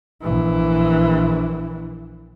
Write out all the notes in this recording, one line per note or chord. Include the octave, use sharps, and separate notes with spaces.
A#1 E3